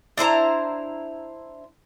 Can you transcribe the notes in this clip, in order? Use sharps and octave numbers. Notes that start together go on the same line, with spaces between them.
D4 E4 C5 A#5